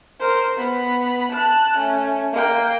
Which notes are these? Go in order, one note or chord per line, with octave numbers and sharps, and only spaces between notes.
A#4 C5
B3 B5
A5 F#6
A3 C#4
A#3 G5